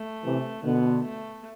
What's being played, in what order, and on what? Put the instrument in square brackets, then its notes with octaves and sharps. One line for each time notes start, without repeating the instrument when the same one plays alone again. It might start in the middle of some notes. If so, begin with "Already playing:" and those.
Already playing: [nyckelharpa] A3
[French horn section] C3 E3
[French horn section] B2 D3 [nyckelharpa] B3
[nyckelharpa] A3